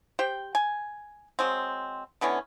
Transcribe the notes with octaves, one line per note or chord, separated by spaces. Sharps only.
G4 C5 G5
G#5
F#3 G#3 C4
D3 E3 B3 C#4